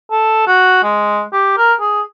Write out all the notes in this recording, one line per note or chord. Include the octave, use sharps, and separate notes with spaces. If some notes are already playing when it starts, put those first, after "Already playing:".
A4
F#4
G#3
G4
A#4
G#4